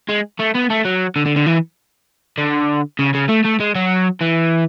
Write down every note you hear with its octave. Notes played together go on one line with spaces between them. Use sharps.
G#3
A3
B3
A3
F#3
D3
D3
D3
E3
D3
C#3
C#3
A3
A3
G#3
F#3
E3